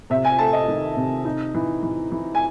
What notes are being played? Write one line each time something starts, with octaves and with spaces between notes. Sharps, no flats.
C3 E5
G#5
A3 A5
D#5
D#3
C3
D#4
E3
E3
E3
G#5